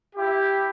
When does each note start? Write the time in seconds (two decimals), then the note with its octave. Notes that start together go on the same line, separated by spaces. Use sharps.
0.16 E4 G4